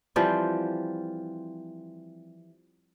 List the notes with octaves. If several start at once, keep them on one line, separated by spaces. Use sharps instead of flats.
E3 F3 G3 C4